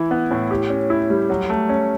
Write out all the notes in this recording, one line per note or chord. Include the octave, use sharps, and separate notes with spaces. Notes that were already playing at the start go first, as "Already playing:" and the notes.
Already playing: E3 E4
B3
A2
G4
C#4
E4
G3
F#3
A3
C#4